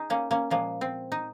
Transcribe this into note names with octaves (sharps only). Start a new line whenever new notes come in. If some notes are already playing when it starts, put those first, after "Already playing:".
Already playing: D#4 G#4
A#3 C#4
A#3 C#4
A#2 F3 G#3 A#3
C4
D#4